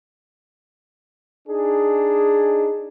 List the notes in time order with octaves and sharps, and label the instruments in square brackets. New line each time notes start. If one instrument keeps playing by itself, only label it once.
[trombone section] D4 D#4 G#4